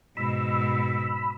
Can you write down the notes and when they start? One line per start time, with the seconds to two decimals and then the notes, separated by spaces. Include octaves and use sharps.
0.17 G#2 B2 B5 E6